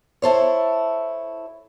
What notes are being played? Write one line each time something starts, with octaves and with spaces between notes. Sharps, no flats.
E4 A4 C5 C#5